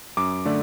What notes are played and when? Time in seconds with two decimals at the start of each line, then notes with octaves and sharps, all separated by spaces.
0.17 F#2 D6
0.45 D3 A3 D5